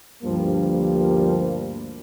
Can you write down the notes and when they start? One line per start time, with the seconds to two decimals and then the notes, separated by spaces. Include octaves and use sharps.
0.23 D2 G2 F3 G3 A#3